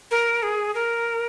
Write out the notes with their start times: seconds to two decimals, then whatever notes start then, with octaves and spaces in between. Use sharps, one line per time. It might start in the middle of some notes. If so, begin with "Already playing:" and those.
0.11 A#4
0.43 G#4
0.75 A#4